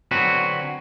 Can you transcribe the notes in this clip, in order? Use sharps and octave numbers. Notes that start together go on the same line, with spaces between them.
D3 F#3 C4 F#4 B4